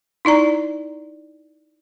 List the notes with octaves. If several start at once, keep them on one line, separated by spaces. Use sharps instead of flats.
D#4 E4 D5 A#5